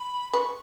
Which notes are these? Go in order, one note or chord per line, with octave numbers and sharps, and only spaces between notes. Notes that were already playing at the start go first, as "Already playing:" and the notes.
Already playing: B5
B4 C#6